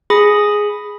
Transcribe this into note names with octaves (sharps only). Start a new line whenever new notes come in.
G#4 B5 D#6